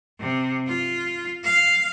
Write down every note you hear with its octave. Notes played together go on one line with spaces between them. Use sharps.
C3
F4
F5